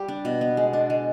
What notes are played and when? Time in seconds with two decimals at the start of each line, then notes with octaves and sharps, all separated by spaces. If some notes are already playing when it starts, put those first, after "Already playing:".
Already playing: G3 G4
0.08 D4
0.25 B2
0.41 B3
0.57 G#3
0.73 D4
0.90 G#3